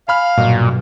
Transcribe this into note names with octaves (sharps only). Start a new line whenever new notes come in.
F5 G#5 B5 F6
B1 G2 A#2 F#4 D#5